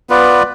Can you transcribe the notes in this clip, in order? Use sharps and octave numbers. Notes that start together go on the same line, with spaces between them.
B3 F4 B4 D5